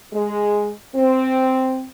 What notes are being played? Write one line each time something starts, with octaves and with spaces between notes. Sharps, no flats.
G#3
C4